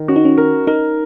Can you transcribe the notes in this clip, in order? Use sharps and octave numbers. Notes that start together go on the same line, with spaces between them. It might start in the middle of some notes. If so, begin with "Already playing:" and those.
Already playing: D#3
C#4 F#4
D#4
C#4
A#4
D#4 A#4